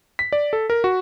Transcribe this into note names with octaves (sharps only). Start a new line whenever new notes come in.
B6
D5
A4
A#4
F#4